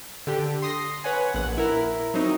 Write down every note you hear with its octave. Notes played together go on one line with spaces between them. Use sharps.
D3 G4
C6 D#6 A#6 C7
B4 C#5 F#5 G#5
A#1 F#5
E4 A#4
F#3 C4 D#4